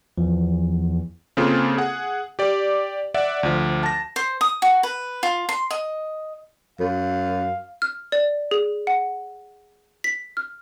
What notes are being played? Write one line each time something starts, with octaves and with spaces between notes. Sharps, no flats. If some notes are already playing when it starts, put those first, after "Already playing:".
E2 F3
C#3 A#3 C4 F4 G#4 A4
G#4 F#5
G4 D5
D5 E5 F#5
D2 F3
A5 A#6
C5
D#6
F#4
B4
F4
C6
D#5
F#2 F5
F6
D5
G#4
F#5
B6
F6